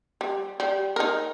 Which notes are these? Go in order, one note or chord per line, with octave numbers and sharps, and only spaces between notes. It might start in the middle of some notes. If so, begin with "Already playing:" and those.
G3
G3
D#4 A#4